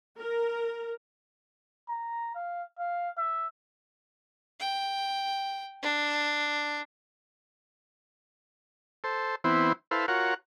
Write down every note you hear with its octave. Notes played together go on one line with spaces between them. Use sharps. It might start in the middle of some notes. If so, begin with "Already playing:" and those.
A#4
A#5
F5
F5
E5
G5
D4
A4 C5
E3 B3 C4 E4 C5
E4 A4 B4 C5 F5
F4 F#4 A#4 C#5 F#5